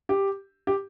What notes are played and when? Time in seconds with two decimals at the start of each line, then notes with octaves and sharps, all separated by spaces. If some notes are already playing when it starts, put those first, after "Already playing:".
0.09 G4
0.67 G4